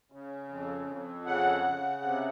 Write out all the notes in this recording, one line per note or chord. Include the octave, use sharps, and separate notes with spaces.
C#3
F2
F2
C#3 F#5
C#3
C3